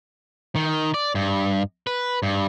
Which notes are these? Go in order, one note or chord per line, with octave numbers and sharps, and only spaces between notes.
D#3
D5
G2
B4
G2